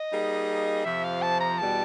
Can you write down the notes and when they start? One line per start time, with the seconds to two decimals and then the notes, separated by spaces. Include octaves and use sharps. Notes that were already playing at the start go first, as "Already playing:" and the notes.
Already playing: D#5
0.11 G3 A#3 D#4 G#4
0.85 F2 C3 F3 E5
1.03 F5
1.22 A5
1.40 A#5
1.58 E2 B2 G3 A5